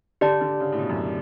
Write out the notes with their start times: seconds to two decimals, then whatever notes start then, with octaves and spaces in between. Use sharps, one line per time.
0.21 D3 G4 D5 A5
0.41 D3
0.60 C#3
0.72 A2
0.79 B2
0.89 F#2